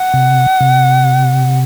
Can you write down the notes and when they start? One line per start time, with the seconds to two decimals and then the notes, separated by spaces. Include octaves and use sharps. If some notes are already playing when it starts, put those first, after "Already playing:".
Already playing: F#5
0.14 C3
0.61 C3